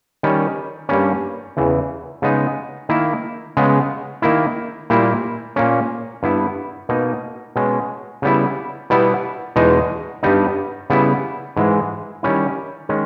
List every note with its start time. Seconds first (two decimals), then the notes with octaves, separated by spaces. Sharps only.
0.23 D#3 G3 C#4
0.89 G2 G3 A#3 C#4
1.57 E2 C#3 E3
2.22 C#3 G#3 B3 D#4
2.89 D#3 A#3 E4
3.57 C#3 G#3 B3
4.22 D#3 A#3 E4
4.90 A#2 G3 A#3 E4
5.56 A#2 A#3 C#4
6.23 G2 G3 B3 E4
6.89 B2 A#3 D#4
7.56 B2 G#3 C#4
8.22 C#3 G3 B3 E4
8.90 B2 G3 B3 E4
9.56 E2 B2 G#3 D#4
10.23 G2 G3 B3 D#4
10.90 C#3 G3 B3 E4
11.57 G#2 E3 G#3
12.23 D#3 G3 C#4 E4
12.89 D#3 G#3 C#4